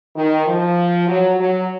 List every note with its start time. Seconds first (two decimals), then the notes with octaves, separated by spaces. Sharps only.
0.16 D#3
0.47 F3
1.09 F#3
1.39 F#3